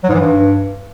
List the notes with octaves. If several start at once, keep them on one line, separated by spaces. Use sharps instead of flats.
F#3
G#2
E3
G2